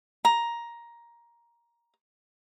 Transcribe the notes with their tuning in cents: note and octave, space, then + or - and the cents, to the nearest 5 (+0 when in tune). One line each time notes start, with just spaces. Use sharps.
A#5 +10